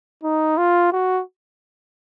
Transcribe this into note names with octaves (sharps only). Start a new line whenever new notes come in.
D#4
F4
F#4